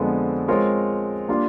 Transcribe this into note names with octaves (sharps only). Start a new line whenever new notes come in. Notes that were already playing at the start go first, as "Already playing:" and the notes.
Already playing: F2 D3 F3 G#3 B3
G#3 C4 F4 A#4 C#5
G3 A#3 D4 F4